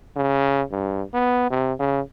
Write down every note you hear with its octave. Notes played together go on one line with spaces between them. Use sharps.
C#3
G2
B3
C3
C#3